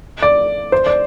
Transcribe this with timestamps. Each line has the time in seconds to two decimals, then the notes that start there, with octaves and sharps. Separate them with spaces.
0.22 D5
0.72 C5
0.86 D5